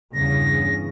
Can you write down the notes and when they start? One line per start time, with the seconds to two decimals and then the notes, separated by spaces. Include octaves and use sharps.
0.14 E2 G2 C#3 A#6